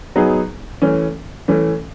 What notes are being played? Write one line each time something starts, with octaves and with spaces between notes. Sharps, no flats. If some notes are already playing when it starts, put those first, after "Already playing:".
F#3 B3 D#4 G#4
E3 A3 C#4
E3 A3 C#4